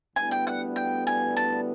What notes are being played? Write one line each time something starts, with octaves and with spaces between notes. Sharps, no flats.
D2 D3 G3 B3 E4 G#5
G5
F#5
G5
G#5
A5